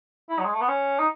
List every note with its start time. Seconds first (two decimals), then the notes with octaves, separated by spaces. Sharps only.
0.30 E4
0.39 F#3
0.45 G#3
0.54 A3
0.61 B3
0.68 C#4
0.99 D#4